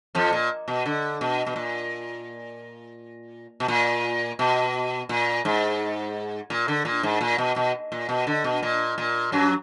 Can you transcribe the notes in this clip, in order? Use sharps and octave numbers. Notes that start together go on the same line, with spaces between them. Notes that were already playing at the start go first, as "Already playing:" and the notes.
F2 F3
A#2
B2
D3
B2
B2
A#2
B2
A#2
B2
A#2
G#2
A#2
D3
A#2
G#2
A#2
B2
B2
A#2
B2
D3
B2
A#2
A#2
F#2 F#3